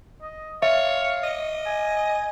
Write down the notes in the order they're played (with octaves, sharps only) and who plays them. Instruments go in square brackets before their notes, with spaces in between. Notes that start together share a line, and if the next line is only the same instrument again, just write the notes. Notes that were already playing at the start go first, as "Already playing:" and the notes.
[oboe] D#5
[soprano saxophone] C#5 [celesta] E5 [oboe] F5
[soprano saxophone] D#5
[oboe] G#5